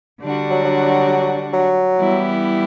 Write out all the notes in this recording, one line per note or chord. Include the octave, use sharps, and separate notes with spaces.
D3 G3 D4 F#4
F#3
F#3
F#3
E3 G3 B3 E4 G4